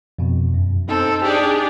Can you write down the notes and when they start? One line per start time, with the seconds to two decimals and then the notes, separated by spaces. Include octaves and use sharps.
0.19 F2 B2
0.54 F#2
0.89 C4 D#4 A4
1.24 D4 G4 G#4 D5